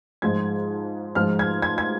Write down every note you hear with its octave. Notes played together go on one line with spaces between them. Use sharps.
G#2 F3 G#3 G#6
G#2 F3 G#3 F6
G#6
G#6
G#6